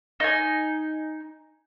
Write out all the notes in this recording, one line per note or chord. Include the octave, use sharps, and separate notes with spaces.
D#4 G#5